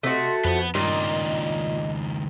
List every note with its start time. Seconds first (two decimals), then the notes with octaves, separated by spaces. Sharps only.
0.03 C3 A3 F#4 A4 D#5 C6
0.45 F2 B4 C5 F#5
0.75 C#2 G2 A#2 D#3 D#5